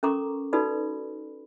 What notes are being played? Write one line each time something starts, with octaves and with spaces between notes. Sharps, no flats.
C#4 A4 A#4 A#5 C#6 D6
D#4 F#4 A4 B4 D5 B5